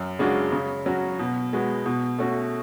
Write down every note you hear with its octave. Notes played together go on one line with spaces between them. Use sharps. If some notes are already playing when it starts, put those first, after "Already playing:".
Already playing: F#2
C#3 G#3 D4 F#4
C#3
F#3 C#4 F#4
B2
G#3 B3 F#4
B2
A3 C#4 F#4